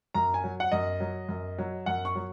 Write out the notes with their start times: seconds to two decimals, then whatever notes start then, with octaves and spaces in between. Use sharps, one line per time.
0.14 F#2 A#5
0.34 G#5
0.44 F#3
0.60 F#5
0.72 F#2 D#5
1.00 F#3
1.29 F#2
1.58 F#3
1.86 F#2 F#5
2.05 C#6
2.15 F#3